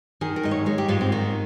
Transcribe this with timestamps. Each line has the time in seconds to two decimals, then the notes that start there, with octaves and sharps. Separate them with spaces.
0.21 D#3 G#4
0.36 A#4
0.43 G#2 D#5
0.51 C#5
0.66 G#3 C#5
0.78 G4
0.88 G#2 F4
1.01 C4
1.12 D#3 D#4